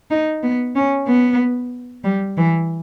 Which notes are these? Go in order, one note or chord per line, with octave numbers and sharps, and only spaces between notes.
D#4
B3
C#4
B3
G3
E3